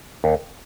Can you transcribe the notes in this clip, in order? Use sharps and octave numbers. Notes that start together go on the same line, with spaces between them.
D#2